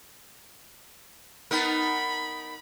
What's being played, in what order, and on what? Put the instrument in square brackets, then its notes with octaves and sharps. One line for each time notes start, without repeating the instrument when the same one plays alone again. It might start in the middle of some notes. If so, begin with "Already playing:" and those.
[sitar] B3 D#4 A#4 [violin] B5